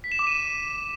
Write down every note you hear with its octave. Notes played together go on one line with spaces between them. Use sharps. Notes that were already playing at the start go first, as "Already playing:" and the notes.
B6
E7
D6
D#7